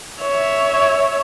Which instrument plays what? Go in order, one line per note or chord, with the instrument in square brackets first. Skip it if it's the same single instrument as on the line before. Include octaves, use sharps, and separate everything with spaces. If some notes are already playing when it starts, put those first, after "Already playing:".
[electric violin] C#5 E5